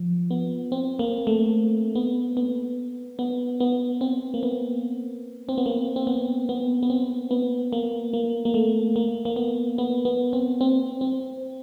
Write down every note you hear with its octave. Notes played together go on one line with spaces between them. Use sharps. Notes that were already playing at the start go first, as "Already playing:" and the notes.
Already playing: F3
B3
C4
A#3
A3
B3
B3
B3
B3
C4
A#3
B3
C4
B3
A#3
C4
B3
B3
B3
C4
B3
A#3
A#3
A#3
A3
A#3
A#3
B3
B3
B3
C4
C4
C4